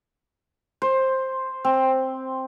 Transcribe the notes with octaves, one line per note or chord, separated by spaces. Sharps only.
C5
C4